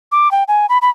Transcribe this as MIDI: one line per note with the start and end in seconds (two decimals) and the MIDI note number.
0.12 0.31 86
0.31 0.44 79
0.48 0.66 80
0.69 0.78 83
0.82 0.90 83